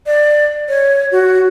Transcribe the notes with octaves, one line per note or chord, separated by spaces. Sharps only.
D5
C#5
F#4